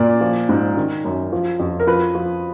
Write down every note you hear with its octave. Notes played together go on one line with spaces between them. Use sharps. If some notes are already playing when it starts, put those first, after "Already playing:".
Already playing: A#2 D5
F3
G#2
D#3
F#2
F3
F2
A#4
F3 B4
F3